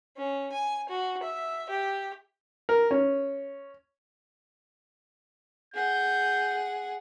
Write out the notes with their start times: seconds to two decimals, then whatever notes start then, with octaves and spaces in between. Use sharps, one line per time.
0.17 C#4
0.52 G#5
0.89 F#4
1.23 E5
1.69 G4
2.69 A#4
2.91 C#4
5.74 G#4 F#5 G6